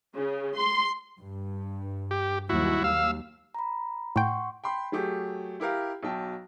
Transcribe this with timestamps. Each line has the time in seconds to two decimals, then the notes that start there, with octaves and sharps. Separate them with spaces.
0.15 C#3
0.57 C6
1.20 G2
2.11 G4
2.49 D#2 F#3 G3 E4 F#4
2.84 D#2 F5 E6
3.55 A#5 B5
4.16 A2 F#5 G5 C6 C#6
4.64 G5 B5 C6
4.92 F#3 A3 G4 G#4
5.60 E4 G4 A#4 F5
6.03 B1 F#3 G5 A5